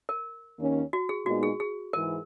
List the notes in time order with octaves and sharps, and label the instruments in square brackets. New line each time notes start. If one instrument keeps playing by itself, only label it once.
[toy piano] A#4
[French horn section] D#2 D#3 A#3 C#4
[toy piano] F#4
G#4
[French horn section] A#2 G#3 B3 D#4 [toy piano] F#4
[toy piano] G#4
G#4
[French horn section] G#2 E3 [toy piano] A#4